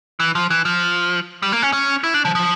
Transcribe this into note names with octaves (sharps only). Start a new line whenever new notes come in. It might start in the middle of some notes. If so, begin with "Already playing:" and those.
E3
F3
E3
F3
G3
A#3
C#4
C#4
E4
D4
F3
F3